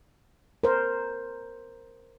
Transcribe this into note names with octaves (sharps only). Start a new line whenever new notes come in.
A#4 C5